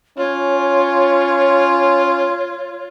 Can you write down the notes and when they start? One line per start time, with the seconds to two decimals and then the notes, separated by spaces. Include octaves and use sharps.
0.17 C#4 F4 C#5